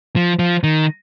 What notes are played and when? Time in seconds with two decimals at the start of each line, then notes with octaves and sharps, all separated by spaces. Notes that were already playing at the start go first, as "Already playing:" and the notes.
0.16 F3
0.39 F3
0.63 D#3